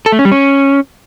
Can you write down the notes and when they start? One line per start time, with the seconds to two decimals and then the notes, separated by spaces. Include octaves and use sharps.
0.06 A4
0.12 A3
0.19 C#4
0.25 G3
0.32 C#4